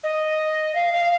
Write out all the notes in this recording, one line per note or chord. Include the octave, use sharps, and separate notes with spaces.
D#5
F5
F5